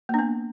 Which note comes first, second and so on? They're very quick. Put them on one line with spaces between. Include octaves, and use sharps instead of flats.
A#3 D4 B3